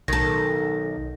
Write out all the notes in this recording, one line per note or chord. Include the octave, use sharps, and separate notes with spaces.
B1 D#3 A4 A#6